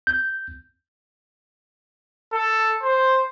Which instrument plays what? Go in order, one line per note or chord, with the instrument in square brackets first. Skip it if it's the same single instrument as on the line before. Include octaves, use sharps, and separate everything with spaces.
[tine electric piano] G6
[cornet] A4
C5